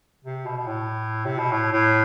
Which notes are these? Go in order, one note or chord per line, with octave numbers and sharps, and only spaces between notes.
C3
B2
B2
A2
C3
B2
A2
A2